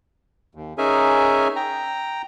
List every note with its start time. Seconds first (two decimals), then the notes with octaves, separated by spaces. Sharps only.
0.55 D#2
0.78 C#4 D#4 G#4 A#4 E5 G#5
1.56 G5 A#5